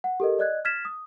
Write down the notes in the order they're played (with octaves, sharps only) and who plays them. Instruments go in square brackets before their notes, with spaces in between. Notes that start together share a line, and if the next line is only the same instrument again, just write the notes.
[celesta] F#5
G4 A4 A#4 D#5
D5 D#5 F#6 G#6
F6 G#6 A6 B6 E7
D#6